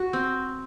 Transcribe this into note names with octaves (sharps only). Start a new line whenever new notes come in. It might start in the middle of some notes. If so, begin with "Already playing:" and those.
Already playing: F#4
C4